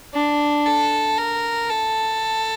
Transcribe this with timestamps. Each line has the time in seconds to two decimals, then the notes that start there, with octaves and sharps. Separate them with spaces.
0.14 D4
0.66 A4
1.18 A#4
1.70 A4